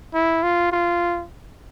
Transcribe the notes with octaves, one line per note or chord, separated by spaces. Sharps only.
E4
F4
F4